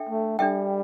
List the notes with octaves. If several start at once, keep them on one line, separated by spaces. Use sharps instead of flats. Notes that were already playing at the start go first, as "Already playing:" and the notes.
Already playing: D4 A4 E5 G5
A3
G3 D4 A4 E5 G5